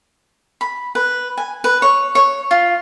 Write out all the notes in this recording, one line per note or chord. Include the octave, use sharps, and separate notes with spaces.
B5
B4
G#5
B4
C#5
C#5
F4